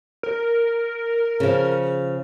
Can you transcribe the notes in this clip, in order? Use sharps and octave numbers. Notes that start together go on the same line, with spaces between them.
A#4
C#3 F3